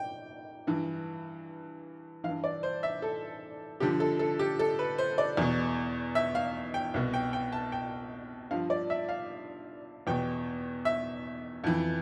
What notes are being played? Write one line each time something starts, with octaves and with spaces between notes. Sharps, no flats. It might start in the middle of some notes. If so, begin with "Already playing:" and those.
Already playing: G5
G2 E3
E3 F5
G2
D5
C5
E5
A4
G2 D3 F3 G4
A4
A4
G4
A4
B4
C5
D5
E2 B2
E5
F5
G5
C2 B2
G5
G5
A5
G5
G2 F3 F5
D5
E5
F5
E2 B2 G5
E5
F2 E3